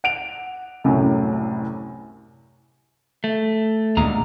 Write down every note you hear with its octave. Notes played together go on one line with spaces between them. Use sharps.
F#5 D7 F7
C2 F#2 A2
A3
D2 A#2 G#3 A#5